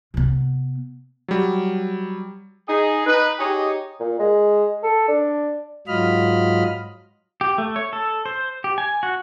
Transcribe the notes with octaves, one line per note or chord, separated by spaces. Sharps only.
C3 B3
F#3 G3
D#4 G#4
D#4 B4
D#4 G4 G#4 C#5 D#5
A#2
G#3
A4
D4
G#2 F#3 F4 D#5 B5 F6
G4
A3
C#5
A4
C5
G4
G#5
F#4